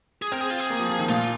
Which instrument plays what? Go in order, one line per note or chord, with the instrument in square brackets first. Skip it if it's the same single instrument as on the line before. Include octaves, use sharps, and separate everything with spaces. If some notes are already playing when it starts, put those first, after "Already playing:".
[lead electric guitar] G#4
[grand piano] C4 [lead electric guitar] A#4
[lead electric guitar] G#4
F4
G#4
[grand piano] A#3
F3
F3
D#3
[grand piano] A#2 [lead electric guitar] F4